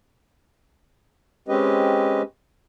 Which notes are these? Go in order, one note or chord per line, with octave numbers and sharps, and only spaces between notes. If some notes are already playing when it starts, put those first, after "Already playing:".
G#3 C4 C#4 G4 B4 D#5